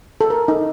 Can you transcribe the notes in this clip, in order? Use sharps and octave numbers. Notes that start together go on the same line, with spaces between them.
A4
A#4
D#4